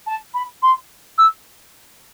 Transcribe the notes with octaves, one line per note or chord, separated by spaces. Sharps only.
A5
B5
C6
E6